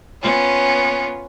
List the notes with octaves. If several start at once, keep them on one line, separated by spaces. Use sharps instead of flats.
B3 C#4 F4